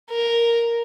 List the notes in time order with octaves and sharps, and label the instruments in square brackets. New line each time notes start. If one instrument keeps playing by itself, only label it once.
[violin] A#4